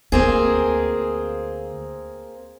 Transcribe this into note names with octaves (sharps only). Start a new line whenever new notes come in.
D2 A#3 C4 G#4